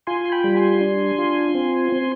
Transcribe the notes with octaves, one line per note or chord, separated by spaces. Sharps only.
F4 G#5 C6
C6
G5 B5
G3
G#5 C6
D4
F4
C4
C4